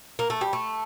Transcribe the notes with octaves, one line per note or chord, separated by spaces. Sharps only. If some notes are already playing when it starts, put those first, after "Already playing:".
A#3
A3
G3
A3